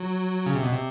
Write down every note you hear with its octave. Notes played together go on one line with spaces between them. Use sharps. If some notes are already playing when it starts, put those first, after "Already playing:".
Already playing: F#3
C#3
C3
B2
C3